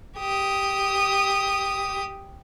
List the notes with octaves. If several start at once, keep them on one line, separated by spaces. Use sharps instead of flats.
G4 D#6